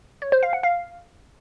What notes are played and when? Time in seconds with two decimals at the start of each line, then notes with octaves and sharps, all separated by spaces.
0.22 C#5
0.32 C5
0.43 F5
0.53 F#5
0.63 F5